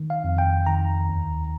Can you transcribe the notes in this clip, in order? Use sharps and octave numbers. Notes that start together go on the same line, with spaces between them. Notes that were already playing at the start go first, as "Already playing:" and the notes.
Already playing: D#3
F5
F2
G5
D#3 A#5
D#2